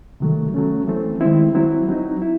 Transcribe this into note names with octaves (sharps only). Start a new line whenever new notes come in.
C3 D#3 F#3 A3
F#3 A3 C#4
E3 A3 C4
D#3 G#3 C4 E4
F#3 C4 E4
F#3 C4 D#4
E4